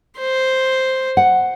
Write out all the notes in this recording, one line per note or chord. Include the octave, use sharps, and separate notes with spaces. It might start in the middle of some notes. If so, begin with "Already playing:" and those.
C5
F#5